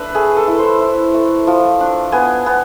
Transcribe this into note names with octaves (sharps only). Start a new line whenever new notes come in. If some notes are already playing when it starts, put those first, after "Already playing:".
Already playing: D4 B4 E5
A3 G#4
A4
E4
C5
E4
A3
F3
D4
B3 G#5
B3